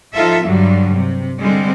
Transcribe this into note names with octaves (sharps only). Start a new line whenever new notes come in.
F3 D#4 F4 A4 E5
G2 D3 F#3 G3
C3
D3 G3 G#3 C4